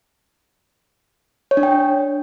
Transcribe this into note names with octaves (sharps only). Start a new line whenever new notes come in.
C#5
D4
G5